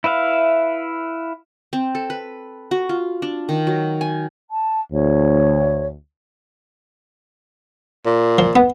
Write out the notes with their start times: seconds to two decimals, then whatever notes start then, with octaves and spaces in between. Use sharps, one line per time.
0.04 E4 B4 E5 F5
1.73 C4
1.95 A4
2.10 B4
2.71 F#4
2.89 F4
3.22 D4
3.49 D#3
3.67 F#3
4.01 G#5
4.50 A5
4.92 D2 C#5
8.06 A#2
8.38 F3
8.56 B3